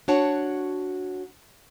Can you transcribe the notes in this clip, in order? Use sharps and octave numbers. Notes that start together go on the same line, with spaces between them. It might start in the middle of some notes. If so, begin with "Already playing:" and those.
D4 F#4 C#5 F#5 A5